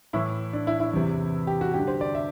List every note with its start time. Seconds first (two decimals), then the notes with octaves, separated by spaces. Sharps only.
0.13 A2 E3 E4
0.53 D4
0.67 E4
0.80 E4
0.93 E2 C3 E3
1.47 G4
1.61 F#4
1.74 G2 D3 G4
1.88 C5
2.01 D5
2.15 E5